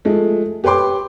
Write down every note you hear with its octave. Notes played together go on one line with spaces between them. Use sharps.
F3 G#3 A3
G4 B4 C#5 G5 C6 D6